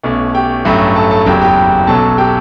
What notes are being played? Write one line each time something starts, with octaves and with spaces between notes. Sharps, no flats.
B1 B2 A3 C#4
G4 G5
A1 G2 F#3 A3 C#4
A4 A5
A4 A5
F#1 E2 C#3 F#3 G4 G5
G4 G5
B1 B2 F#3 C#4 A4 A5
G4 G5